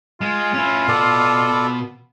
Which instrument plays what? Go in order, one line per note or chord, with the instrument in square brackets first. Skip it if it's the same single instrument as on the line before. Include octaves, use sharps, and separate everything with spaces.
[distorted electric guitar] G#3 [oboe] F4
[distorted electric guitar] C#4 E4
[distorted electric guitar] B2 F#5 [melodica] A4 D5